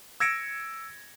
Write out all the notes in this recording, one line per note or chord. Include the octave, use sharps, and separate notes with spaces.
E6 G#6 A#6 C#7 D7 E7